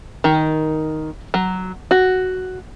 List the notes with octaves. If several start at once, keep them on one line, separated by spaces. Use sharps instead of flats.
D#3
F#3
F#4